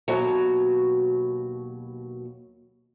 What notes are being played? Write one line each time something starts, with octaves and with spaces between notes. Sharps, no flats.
D#2 B2 F#3